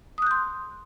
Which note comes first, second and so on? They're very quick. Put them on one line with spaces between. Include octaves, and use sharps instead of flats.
D#6 F#6 G6 C6